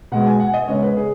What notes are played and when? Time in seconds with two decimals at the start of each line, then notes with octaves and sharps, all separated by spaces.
0.12 B2 G#3 B3 F#5
0.26 G#5
0.40 F#5
0.54 D#5
0.68 C#3 G#3 B3 C#5
0.83 B4
0.97 G#4